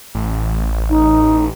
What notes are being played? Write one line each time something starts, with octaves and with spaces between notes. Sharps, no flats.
A1
D#4